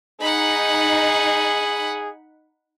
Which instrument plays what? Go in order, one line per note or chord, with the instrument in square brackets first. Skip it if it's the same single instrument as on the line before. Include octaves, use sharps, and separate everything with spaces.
[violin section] D#4 [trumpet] G#4 [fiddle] F#5 B5